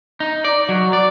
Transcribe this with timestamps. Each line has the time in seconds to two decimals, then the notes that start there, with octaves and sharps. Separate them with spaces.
0.20 D#4
0.45 D5
0.69 F#3
0.93 D5